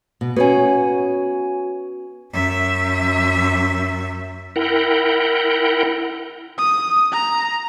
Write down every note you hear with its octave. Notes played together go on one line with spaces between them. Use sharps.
B2
B3 C#4 F#4 C#5 G#5
F#2 E5
E4 A#4 F#5 G5
D#6
A#5